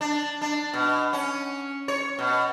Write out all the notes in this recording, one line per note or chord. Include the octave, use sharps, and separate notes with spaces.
D4
D4
B2
C#4
C#5
B2